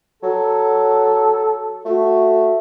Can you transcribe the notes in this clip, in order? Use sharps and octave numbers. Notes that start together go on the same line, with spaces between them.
F#3 A4
A3 F#4